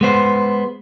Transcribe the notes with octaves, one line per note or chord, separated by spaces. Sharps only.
G#3 B3 C5